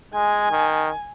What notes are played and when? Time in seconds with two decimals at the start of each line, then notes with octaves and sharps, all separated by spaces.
0.14 G#3 G#5
0.51 D#3